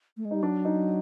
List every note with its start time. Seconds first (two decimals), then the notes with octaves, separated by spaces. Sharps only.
0.17 A3
0.25 G#3
0.31 G3 D#4
0.42 F#3 D4
0.65 D#4